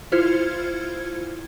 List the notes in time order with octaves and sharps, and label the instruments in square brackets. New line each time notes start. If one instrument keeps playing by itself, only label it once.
[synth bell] E4 F4 C5 F6 G#6 C#7